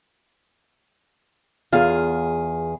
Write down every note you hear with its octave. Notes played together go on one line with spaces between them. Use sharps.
E2 F4 G#4 F5